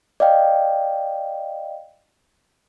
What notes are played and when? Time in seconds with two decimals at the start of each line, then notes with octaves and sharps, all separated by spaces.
0.20 D5 D#5 F5 G5